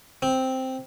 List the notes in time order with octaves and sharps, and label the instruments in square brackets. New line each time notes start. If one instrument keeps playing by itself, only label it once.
[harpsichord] C4